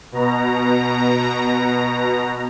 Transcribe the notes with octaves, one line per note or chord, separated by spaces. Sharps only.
B2 A#5